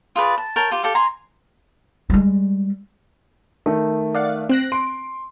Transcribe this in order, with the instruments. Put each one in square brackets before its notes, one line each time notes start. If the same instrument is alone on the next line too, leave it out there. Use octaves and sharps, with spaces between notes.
[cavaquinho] F4 G#4 B4 D5
A5
A#4 C#5 G5 A5
F4 G4
G4 A4 D5 F5
G#5 A#5 C6
[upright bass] G3 G#3
[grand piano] D#3 A3
[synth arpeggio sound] D5 F5 F#5
C4 F#6 A#6
[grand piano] C6 [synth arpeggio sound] D7